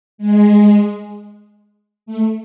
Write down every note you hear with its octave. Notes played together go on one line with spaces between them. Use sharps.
G#3
A3